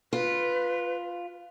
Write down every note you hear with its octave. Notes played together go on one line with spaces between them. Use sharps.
F4 B4